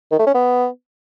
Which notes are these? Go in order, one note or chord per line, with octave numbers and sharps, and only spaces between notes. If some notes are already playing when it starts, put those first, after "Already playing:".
D#3
A3
C#4
B3